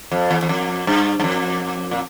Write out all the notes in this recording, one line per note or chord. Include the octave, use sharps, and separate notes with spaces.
F2
E2
E2
F2
G2
G2
F2
A#2